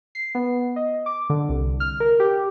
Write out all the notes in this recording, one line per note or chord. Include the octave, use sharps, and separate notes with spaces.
C7
B3
D#5
D6
D3
C2
F6
A#4
G4